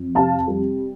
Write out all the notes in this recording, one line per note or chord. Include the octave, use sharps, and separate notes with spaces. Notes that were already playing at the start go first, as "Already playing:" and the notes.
Already playing: F2
C3 F5 A5
G3